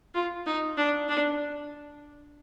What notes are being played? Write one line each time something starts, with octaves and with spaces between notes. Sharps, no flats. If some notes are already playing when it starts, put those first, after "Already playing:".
F4
D#4
D4
D4